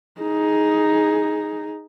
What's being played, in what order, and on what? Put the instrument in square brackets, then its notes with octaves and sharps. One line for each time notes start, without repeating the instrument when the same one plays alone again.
[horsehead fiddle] D#4 G#4